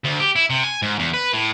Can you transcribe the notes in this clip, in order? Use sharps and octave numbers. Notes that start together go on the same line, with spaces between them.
D2
G4
E4
C3
G#5
G#2
E2
B4
A2